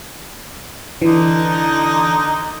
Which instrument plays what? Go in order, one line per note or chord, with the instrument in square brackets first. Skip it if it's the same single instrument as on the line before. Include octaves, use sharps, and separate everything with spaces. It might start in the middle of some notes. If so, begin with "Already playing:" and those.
[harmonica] D3 D#4 [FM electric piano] E3